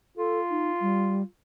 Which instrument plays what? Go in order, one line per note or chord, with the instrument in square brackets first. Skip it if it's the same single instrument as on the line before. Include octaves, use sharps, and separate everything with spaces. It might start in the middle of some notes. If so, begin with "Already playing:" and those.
[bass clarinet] F4 [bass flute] A4
[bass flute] D#4
G3